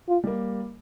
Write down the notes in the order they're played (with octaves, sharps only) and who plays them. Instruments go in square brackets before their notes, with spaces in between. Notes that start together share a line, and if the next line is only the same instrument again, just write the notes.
[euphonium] F4
[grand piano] G3 A#3